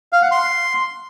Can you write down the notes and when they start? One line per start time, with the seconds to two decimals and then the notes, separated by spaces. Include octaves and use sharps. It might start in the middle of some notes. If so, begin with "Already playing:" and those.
0.13 F5
0.22 F#5
0.31 C6